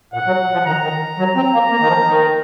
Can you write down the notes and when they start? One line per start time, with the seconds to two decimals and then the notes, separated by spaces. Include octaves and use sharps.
0.14 A#2 F#5
0.27 F#3
0.53 F3
0.66 D#3 A#5
0.83 D#3
1.19 F#3
1.36 C4
1.54 A#3
1.71 A#3
1.80 D#3
1.88 F3
2.06 D#3